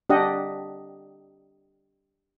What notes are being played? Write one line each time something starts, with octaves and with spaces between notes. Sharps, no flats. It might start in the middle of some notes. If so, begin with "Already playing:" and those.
D4 G4 D#5 F#5